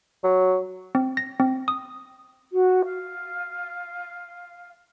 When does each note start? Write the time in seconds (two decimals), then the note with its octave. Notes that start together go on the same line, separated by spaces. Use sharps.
0.24 F#3
0.95 C4
1.17 A#6
1.40 C4
1.68 D#6
2.52 F#4
2.84 F5